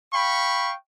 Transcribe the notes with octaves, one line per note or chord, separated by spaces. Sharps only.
F5 G5 B5 C#6